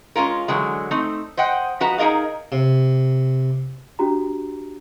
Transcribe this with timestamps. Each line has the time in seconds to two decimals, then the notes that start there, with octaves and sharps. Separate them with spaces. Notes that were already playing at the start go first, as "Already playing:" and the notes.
0.16 G#3 C#4 F4 A#4
0.48 D3 E3 F#3 G#3
0.91 A3 C4 D#4
1.37 C5 D#5 F#5 G5
1.80 F3 F#4 B4 D#5 A#5
1.98 D#4 G#4 A#4 D#5 F5
2.52 C3
3.99 D4 F#4 G4 A#5